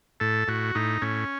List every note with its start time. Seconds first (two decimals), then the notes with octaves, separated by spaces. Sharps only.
0.20 A2 A4
0.48 A2 F#4
0.75 A2 D#4
1.02 A2 C#4